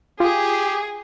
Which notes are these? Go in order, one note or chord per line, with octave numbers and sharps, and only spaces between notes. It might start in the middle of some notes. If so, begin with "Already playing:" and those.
F4 G4 G#4